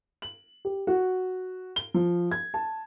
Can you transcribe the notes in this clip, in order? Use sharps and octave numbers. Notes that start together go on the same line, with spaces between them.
F#7
G4
F#4
G7
F3
G#6
A5